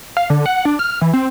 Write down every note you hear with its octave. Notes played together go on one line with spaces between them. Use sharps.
F5
D3
F#5
D4
F6
E3
C4